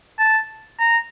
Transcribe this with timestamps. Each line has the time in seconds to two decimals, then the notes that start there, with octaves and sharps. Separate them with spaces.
0.19 A5
0.79 A#5